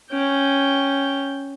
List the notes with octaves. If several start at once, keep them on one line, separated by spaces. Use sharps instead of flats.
C#4 G5